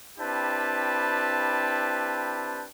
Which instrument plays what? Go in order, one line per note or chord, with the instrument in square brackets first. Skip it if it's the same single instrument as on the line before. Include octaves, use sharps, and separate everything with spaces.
[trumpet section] C4 D4 E4 G4 B4 A5